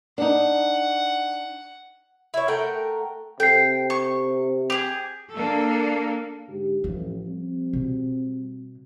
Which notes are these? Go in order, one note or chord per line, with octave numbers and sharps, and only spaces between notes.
D4 D#4 F#5
E4 C#5
A3 A#4 F#5 G5
C3 A4 G5 C7
C#6
G4 G#4 F7
A#3 D4 A4
G#2 D3 G4
A1 F3
G3 C4
B2